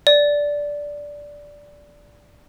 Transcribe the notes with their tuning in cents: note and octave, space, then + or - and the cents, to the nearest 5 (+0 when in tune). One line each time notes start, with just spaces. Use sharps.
D5 -5